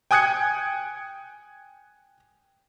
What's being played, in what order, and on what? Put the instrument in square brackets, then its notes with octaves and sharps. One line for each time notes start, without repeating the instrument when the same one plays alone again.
[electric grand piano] G5 G#5 D#6 F#6 G#6 C#7